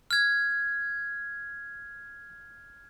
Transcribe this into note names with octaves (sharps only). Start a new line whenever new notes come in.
F6 G#6